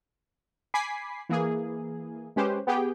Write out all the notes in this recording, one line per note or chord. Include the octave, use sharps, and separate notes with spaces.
G#5 B5 D6 B6 C7
E3 A#3 G#4
G#3 C#4 G4 B4 C5
B3 G4 G#4 G5